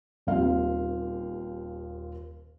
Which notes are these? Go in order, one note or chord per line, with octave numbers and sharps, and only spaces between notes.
D#1 D#2 C4 F5